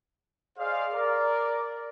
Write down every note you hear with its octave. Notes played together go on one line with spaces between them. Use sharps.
G#4 C5 D5 D#5 F5
A#4 D5